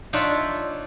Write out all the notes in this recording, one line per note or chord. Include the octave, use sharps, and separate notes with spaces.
D4 D#4 F4 C#5 D5 E5